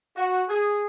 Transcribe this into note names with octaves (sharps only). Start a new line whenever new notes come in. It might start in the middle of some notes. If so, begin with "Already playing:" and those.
F#4
G#4